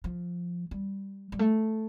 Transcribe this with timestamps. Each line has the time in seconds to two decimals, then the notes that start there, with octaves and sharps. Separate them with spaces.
0.04 F3
0.71 G3
1.32 G3
1.39 A3